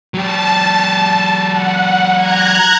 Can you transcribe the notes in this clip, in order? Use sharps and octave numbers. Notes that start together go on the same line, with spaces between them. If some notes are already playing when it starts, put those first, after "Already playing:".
F#3 G4 A5
F#5
A#5 F#6 G#6